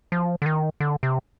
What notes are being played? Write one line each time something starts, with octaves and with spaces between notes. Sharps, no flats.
F3
D3
D#3
D3
C3